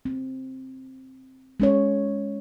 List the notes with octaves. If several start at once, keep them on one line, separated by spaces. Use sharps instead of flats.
C4
G#3 C#4 C#5